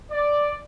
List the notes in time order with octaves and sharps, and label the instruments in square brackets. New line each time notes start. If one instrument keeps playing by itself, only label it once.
[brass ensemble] D5